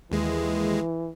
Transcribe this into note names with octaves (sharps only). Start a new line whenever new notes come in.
D#2 E3 G#3